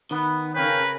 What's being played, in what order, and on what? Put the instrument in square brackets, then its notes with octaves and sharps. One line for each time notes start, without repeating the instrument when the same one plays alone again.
[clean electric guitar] D#3 [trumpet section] B3
[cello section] C#3 C#4 A#4 [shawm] B4 [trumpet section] C#5 F5 G5